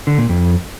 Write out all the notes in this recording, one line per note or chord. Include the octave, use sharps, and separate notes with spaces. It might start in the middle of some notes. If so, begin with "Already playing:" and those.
D3
A#2
F2